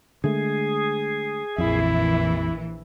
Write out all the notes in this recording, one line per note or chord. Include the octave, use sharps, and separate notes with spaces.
D3 G#3 A3 G#4
A#1 F2 E3 E4